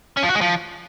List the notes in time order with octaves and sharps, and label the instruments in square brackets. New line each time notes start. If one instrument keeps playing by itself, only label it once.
[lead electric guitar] C#4
F3
F#4
G#3
F3